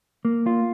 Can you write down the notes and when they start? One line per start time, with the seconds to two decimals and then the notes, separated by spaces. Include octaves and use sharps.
0.25 A#3
0.46 F4